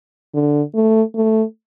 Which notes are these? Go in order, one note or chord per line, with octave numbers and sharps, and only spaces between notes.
D3
A3
A3